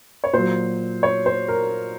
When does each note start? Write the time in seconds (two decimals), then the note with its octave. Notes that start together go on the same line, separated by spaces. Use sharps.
0.24 C#5
0.33 A#2 F#3 C5
1.03 C#5
1.26 C5
1.48 A#4